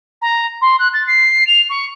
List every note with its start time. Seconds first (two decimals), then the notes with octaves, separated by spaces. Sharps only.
0.22 A#5
0.61 C6
0.79 F#6
0.94 A6
1.07 C7
1.47 F7
1.70 C#6